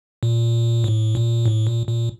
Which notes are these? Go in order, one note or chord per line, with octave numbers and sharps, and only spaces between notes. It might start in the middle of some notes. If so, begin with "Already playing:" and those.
A#2
A2
A#2
A2
A#2
A#2